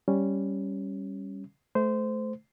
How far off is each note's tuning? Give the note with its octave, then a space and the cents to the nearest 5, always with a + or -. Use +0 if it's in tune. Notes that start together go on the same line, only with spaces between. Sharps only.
G3 +0 C#4 +0
A3 -25 C5 -20